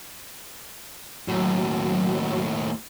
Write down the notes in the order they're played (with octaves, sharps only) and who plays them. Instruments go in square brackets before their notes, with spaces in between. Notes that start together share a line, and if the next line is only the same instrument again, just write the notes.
[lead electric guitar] D#2 A2 [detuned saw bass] F#3